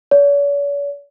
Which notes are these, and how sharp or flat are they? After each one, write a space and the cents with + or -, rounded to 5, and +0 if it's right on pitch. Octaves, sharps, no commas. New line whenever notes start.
C#5 +45